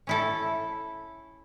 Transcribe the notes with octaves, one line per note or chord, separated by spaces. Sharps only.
C#4 E4 A4